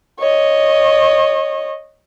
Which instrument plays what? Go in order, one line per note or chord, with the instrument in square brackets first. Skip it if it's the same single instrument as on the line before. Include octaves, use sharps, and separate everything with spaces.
[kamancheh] C#5 D#5